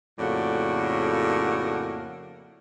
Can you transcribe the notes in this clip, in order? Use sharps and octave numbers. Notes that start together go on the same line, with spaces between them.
F2 A2 C#3 A#3 F#4 D5